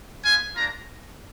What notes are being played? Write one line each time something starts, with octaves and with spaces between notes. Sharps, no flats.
B3 F4 G#5
A#3 D4 F4 A#5